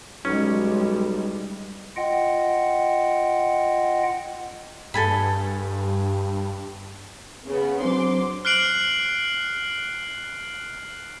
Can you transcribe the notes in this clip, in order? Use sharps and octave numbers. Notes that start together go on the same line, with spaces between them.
B1 G3 G#3 C#4
F4 D#5 F#5 G5
G2 A4 G#5 B5
C#3 B3
F#3 C4 D4 C5 C6 D6
F6 F#6 C7 D7 F#7